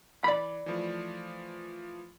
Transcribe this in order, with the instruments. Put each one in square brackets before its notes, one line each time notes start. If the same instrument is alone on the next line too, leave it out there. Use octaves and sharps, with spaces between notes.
[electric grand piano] E3 [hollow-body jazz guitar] D5 B5
[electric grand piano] E3 F3 A3